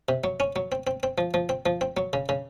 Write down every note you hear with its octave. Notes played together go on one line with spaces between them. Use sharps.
C3
F#3
C#4
F#3
C4
C4
C4
F3
F3
C4
F3
C4
F#3
C#3
C#3